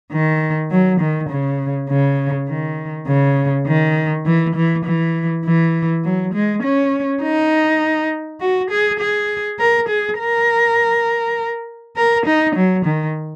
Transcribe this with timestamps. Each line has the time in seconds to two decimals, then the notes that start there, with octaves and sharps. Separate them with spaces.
0.12 D#3
0.71 F#3
1.00 D#3
1.29 C#3
1.89 C#3
2.49 D#3
3.08 C#3
3.67 D#3
4.26 E3
4.55 E3
4.85 E3
5.45 E3
6.04 F#3
6.34 G#3
6.63 C#4
7.22 D#4
8.41 F#4
8.70 G#4
8.99 G#4
9.59 A#4
9.88 G#4
10.19 A#4
11.96 A#4
12.26 D#4
12.55 F#3
12.85 D#3